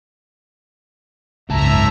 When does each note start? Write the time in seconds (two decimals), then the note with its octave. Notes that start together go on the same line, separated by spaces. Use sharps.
1.49 F#1 C#2 G#2 E5 A5 A#5